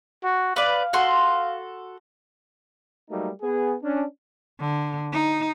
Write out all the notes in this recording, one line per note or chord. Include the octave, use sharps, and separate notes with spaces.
F#4
B4 D5 F5
F#4 A4 C6
F#3 G3 A3 A#3 D#4
B3 G#4
C#4 D4
D3
D#4